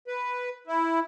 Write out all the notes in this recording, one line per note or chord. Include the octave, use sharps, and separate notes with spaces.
B4
E4